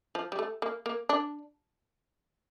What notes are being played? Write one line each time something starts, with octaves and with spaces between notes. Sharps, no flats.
F3
G3
A3
A#3
A#3
D4